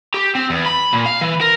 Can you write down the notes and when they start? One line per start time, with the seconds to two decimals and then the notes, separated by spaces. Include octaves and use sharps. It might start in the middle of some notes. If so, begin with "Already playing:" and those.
0.14 G4
0.35 C4
0.50 E2
0.66 B5
0.93 A#2
1.06 F5
1.21 E3
1.41 A#4